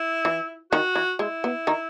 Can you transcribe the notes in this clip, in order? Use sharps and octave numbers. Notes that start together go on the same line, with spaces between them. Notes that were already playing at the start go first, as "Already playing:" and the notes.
Already playing: E4
E3
D#3 F#4
E3
G#3 E4
B3
D#3 D#4